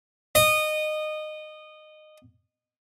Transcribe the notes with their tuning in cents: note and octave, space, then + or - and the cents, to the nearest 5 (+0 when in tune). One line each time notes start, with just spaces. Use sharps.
D#5 -20